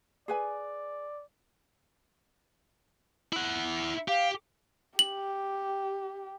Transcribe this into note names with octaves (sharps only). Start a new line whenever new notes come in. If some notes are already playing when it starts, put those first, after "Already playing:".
G#4 B4 D5 G#5
E4 F#5
G4 F5
G4 F#7